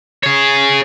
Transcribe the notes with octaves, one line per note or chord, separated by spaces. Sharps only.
G#4 C#5